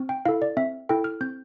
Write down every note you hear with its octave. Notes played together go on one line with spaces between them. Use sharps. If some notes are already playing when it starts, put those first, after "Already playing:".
Already playing: C4
G5
E4 A4 F5
D5
C4 E5
E4 A4 G5
F6
C4 G6